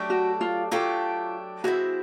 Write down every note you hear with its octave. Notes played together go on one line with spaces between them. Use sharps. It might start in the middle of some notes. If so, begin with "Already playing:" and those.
Already playing: F#3 A3 D4 G4
F#4
F4
F#3 A3 D4 F4 G4
E3 G#3 C4 E4 F#4